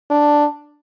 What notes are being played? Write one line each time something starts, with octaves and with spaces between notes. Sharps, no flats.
D4